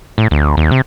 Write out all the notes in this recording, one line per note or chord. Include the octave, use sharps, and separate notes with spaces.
A2
D2
D#2
C3